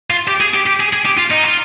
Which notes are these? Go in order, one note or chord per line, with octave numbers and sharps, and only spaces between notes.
F4
G4
G#4
G4
G4
G#4
G#4
G4
F4
D#4
F4